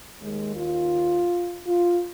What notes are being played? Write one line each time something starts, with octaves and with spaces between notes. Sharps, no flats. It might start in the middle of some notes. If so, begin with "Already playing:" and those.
D#2 D#3 G#3
F4
F4